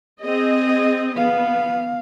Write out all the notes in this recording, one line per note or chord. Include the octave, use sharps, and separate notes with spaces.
C4 G#4 D#5
B3 F5